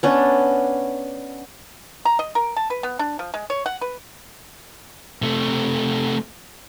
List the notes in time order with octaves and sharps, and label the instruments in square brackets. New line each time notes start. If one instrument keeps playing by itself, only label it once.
[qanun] B3 C#4 D4
[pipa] A#5
D#5
A#4
A5
B4
B3
D4
F3
G#3
C#5
F#5
B4
[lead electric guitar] C3 A3